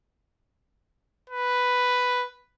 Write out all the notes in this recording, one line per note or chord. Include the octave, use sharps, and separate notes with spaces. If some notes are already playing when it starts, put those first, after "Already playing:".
B4